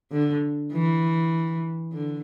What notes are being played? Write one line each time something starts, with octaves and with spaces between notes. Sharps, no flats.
D3
E3
D3